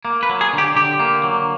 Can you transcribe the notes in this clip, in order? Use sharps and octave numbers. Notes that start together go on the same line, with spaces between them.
A#3
B4
F#3
G#4
D3
G4
D3 G4
A#3
F#3